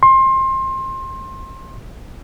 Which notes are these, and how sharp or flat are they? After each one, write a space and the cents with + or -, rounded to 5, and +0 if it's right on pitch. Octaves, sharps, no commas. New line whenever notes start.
C6 +25